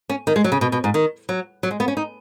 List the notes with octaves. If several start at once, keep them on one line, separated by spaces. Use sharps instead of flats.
C#4
D#3
G#3
F#3
C#3
B2
B2
G#2
D#3
F#3
F#3
G#3
B3
C#4
D#4